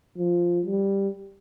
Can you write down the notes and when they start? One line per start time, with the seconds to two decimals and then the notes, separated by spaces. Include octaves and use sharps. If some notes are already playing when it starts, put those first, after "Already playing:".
0.17 F3
0.66 G3